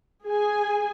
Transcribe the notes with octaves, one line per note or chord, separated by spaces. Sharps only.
G#4 G#5